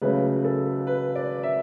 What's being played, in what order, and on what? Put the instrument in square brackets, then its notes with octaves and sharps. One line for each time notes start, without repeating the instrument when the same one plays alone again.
[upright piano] C#2 C#3 F#3 A3 C#4 B4
A4
B4
D5
E5